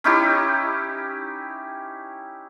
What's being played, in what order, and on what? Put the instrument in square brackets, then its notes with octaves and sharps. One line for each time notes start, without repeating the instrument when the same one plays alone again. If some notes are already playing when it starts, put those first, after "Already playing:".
[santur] C#4 D#4 E4 G4